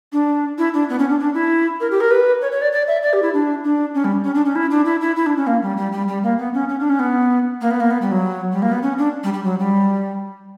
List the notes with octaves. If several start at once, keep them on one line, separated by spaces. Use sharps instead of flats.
D4
E4
D4
B3
C#4
D4
D4
E4
A#4
G4
A#4
B4
C#5
C#5
D5
D5
E5
D5
G4
E4
D4
D4
C#4
G3
C#4
D4
C#4
E4
D4
E4
E4
E4
D4
C#4
A#3
G3
G3
G3
G3
A#3
B3
C#4
C#4
D4
C#4
B3
A#3
B3
A#3
B3
G3
F#3
G3
A#3
B3
C#4
D4
G3
G3
F#3
G3